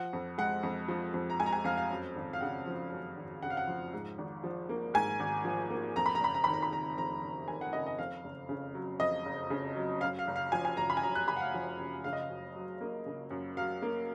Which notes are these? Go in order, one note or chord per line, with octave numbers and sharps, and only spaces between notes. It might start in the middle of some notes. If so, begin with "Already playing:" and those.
Already playing: F3 F#5
F2
G#3 F#5
F2
F3
F2
A#5
G#3 G#5
A#5
G#5
F2 F5
F5
F#2
G#1
F5
C#3 F#5
F3
F#2
G#1
C#3 F#5
F5
F#5
F3
G#2
G#1
F3
A#3
G#2 G#5
G#1
F3
A#3
F2 A#5
B5
A#5
F#1 B5
A#5
D#3 B5
A#5
B5
F#1 A#5
F2 A#5
F#1
D#3 G#5
F#5
F#1 D#5
D#5
F2 F5
F#1
C#3
F#3
F2 D#5
F#1
C#3
F#3
F#2 F5
F5
F#1
F5
F3 G#5
G#5
F#1 A#5
B5
G#5
F#2 A#5
F#6
F#1 B5
F#5
F5
F3
F#1
C#3 F5
D#5
F5
F#2
F#3
A#3
C#3
F#2
F#3 F5
A#3